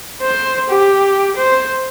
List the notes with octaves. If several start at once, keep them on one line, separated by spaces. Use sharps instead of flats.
C5
G4
C5